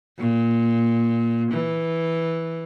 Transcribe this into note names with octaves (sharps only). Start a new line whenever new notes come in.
A#2
E3